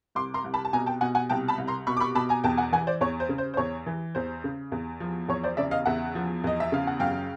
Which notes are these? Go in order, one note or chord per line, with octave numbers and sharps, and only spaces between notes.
C2 C6 D6
A#5 C6
C2
A5 B5
A5
B2 G#5 A#5
G5 A5
B2 F#5 G#5
F#5 G#5
C2 G5 A5
A5 B5
C2
A#5 C6
B2 B5 C#6
D6
B5 C#6
B2 A5 B5
G#5 A#5
E2 G5 A5
F#5 G#5
E3 F#5 G#5
C5 D5
E2 C#5
C5
C#3
C5
C5
E2 C#5
E3
E2 C5
C#3
E2
F3
E2 C#5
C5 D5
C#3 D5 E5
D#5 F5
E2 E5 F#5
F3
E2 D#5
E5
C#3 F5
F#5
F#2 F5 G5